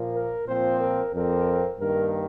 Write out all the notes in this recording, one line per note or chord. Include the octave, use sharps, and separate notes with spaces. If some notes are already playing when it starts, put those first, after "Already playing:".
Already playing: A#2 F3 A#3
A#4
A#2 F3 C4 C5
A#4
F2 F3 C4 A#4
G2 D#3 A#3 A#4